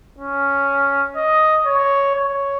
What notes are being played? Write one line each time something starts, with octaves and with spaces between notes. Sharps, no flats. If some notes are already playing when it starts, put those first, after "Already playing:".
C#4
D#5
C#5
C#5